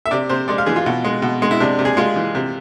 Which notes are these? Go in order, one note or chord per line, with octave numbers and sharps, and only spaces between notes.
E5
C3 D5
C3 C5
G#3 D5
F5
E3 G#4
F4
B2
G#3
B2
G#3
E4
C3 D4
C3
G#4
G#3 F4
E3
C3